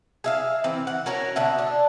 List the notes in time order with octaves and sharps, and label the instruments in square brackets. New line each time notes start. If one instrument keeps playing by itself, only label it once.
[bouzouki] G#4 E5 F5
E3 C4
F#5
C#4 F#4 A#4 C#5
B2 D3 E5 F#5
D4